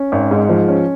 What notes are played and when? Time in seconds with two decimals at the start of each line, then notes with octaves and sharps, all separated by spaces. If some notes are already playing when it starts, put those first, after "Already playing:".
Already playing: C#4
0.12 G#1
0.31 G#2
0.49 F3
0.68 C#4